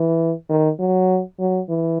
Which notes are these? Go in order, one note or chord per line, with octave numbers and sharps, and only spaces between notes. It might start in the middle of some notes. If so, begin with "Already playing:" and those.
Already playing: E3
D#3
F#3
F#3
E3